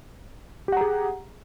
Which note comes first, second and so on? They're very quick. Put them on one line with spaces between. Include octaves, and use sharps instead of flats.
G4 F#5 A#5 G#4